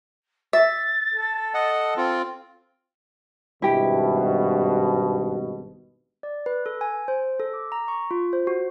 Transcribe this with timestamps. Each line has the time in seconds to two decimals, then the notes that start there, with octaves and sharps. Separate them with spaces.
0.53 E5 A6
1.14 A4
1.54 D#5 F#5
1.97 C4 F4
3.62 G#1 G2 B2 E4 G4
6.23 D5
6.46 B4
6.66 A4
6.81 G#5
7.08 C5
7.40 A4
7.53 D6
7.72 A#5
7.88 C#6
8.11 F4
8.33 C5
8.47 F#4